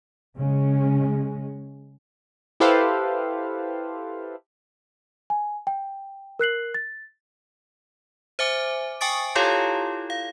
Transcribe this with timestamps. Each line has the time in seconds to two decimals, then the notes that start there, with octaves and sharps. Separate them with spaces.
0.38 C#3 G#3 C#4
2.60 E4 G4 A4 B4 C5 F5
5.30 G#5
5.67 G5
6.39 A#4 F#6 C7 F#7
6.74 A6
8.39 C5 E5 G#5 D6
9.01 G5 G#5 C#6 D#6 A6 D7
9.35 E4 F4 G4 A4 C#5 F5
10.10 F5